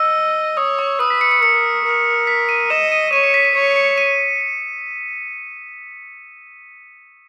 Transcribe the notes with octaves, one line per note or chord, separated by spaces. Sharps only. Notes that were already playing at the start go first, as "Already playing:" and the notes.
Already playing: D#5 E6
C#5 D#6
C#6
B4 D#6
B6
C#7
C#7
A#4 C#7
A#4
B6
D#7
D#5 E7
D#7
C#5 D#7
C#7
B6
D#7
C#5 C#7
C#7
D#7